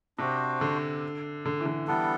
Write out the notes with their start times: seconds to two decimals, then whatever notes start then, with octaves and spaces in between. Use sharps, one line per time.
0.18 C3 D4 F#4 C5
0.61 D3
1.46 D3
1.60 E3
1.66 D3
1.87 E3 G3 B3 D4 A4